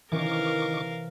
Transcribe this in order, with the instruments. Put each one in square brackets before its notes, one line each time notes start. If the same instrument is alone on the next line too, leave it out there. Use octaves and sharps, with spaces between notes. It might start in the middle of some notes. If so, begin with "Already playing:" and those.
[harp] C3 E3 C#4 [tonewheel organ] D#3 C#6 D6 [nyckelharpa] A#4 F5